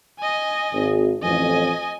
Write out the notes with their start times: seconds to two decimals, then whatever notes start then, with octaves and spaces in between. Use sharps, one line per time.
0.19 D#5 G#5
0.73 G#1
1.23 A1 F2 D#5 G#5